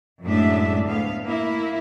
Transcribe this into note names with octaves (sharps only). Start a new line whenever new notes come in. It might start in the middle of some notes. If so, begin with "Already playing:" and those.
F#2 A2 F#3 G#3 D4 E5
D2 B3 F5
A#3 E4